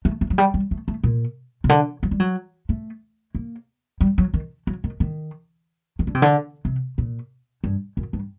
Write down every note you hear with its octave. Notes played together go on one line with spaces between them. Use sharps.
A3
A3
F#3
G3
G3
A3
A3
A#2
C3
D3
F#3
G3
F#3
A3
A#3
G3
F#3
D#3
F#3
D#3
D#3
D#3
D3
C3
D3
C3
A#2
G2
F#2
G2